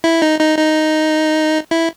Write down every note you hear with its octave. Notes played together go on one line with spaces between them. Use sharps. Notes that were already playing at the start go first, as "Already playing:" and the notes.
E4
D#4
D#4
D#4
E4